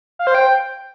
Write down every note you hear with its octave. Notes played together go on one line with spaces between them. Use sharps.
F5
C5
G5